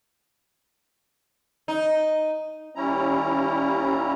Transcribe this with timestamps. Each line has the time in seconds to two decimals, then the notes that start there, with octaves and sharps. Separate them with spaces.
1.68 D#4
2.75 D#2 G3 C#4 E4 A#5